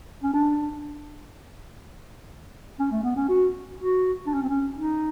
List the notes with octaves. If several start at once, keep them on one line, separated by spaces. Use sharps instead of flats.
C#4
D4
C#4
A3
B3
C#4
F#4
F#4
D4
C#4
C4
C#4
D#4